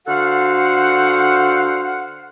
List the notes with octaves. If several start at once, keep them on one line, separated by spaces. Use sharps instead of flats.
D3 F#4 A4 C5 F5 F#5